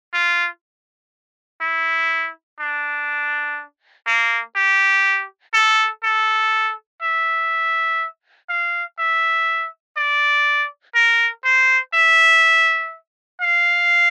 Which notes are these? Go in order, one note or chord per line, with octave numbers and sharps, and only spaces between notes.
F4
E4
D4
A#3
G4
A4
A4
E5
F5
E5
D5
A#4
C5
E5
F5